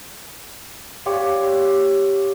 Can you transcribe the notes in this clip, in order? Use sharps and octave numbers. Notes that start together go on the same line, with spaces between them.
F4 G4 C#5